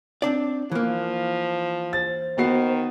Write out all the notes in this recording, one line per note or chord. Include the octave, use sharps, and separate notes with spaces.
C4 D4 D5
E3 F3 A#3
C5 A6
D#3 B3 F#4 C7